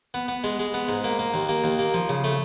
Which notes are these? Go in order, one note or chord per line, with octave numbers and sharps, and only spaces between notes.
B3
B3
G#3
G#3
B3
G#2
A#3
A#3
D#2
A#3
D#2
A#3
F3
C#3
A3